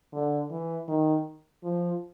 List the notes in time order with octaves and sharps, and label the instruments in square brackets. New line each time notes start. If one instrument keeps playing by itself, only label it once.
[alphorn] D3
E3
D#3
F3